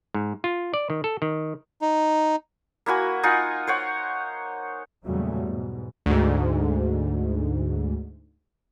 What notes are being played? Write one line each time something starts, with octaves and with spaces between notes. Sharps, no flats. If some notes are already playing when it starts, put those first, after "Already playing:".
G#2
F4
D5
D#3
A4
D#3
D#4
A#3 E4 F#4 G#5
D#4 F4 F#5 G#5
C5 C#5 F#5
E2 A#2 C#3 F#3 G3 A3
G#2 B2
D2 G#2